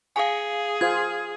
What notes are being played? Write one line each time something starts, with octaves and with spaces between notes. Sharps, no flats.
G#4 F5 G#5
F4 C5 G#6